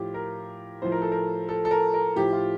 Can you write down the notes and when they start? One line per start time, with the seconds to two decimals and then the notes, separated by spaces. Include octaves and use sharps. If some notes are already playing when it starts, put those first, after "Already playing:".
Already playing: A2 F3 F4 G4
0.14 A#4
0.82 A2 F3 C5
0.92 A#4
1.02 A4
1.12 A#4
1.49 A4
1.65 A4
1.71 A#4
1.94 A#4
2.16 A2 F3 G4
2.33 F4